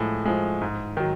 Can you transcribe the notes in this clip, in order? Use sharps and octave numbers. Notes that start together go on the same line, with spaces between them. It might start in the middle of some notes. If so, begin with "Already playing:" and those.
Already playing: A2 F3 G#3
F3 G#3
G#2
D#3 F#3